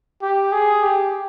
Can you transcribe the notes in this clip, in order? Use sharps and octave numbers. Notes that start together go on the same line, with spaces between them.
G4
G#4
G4